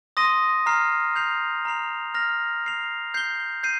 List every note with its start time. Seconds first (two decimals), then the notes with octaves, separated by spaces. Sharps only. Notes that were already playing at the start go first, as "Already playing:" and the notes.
0.17 C6 D#6 A#6 D#7
0.66 A#5 F6 C7
1.16 G6 C7 F7
1.65 A#5 F6 C7 F7
2.14 F6 A#6 F7
2.64 F6 C7 F7
3.14 G6 C7 G7
3.63 G6 C7 D#7